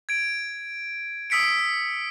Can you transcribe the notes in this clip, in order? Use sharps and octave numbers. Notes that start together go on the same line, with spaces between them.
G#6 D7
D#6 E6 B6 C#7 D7